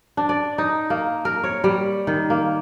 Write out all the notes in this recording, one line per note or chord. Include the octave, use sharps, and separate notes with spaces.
D4
D5
D#4
A#3
A#4
C#5
G3
D#3
A#3